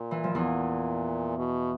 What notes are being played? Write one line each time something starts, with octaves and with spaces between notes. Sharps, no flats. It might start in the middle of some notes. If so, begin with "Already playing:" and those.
Already playing: A#2
E3
F3
E2 E3
B2